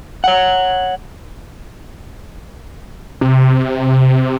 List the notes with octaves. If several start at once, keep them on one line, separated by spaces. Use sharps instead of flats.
C#5 F#5
C3